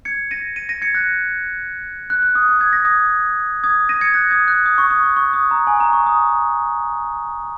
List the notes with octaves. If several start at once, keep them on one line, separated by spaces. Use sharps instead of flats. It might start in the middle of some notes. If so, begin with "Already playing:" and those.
G#6 C#7
A#6 D#7
A#6 D#7
A#6 D#7
G#6 C#7
F#6 A#6
F#6
F#6
D#6
D#6
G#6
A#6
D#6 G#6
D#6 G#6
A#6 D#7
G#6 C#7
F#6 A#6
D#6 G#6
F#6
D#6
C#6
D#6
C#6
C#6
D#6
A#5
G#5
A#5
C#6
D#6